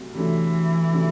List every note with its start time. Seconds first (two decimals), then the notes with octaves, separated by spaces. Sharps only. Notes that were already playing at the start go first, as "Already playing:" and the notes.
Already playing: D2 C3 F#3
0.15 D2 C3 E3 F#3 A3 D4
0.93 C3 F#3 A3 D4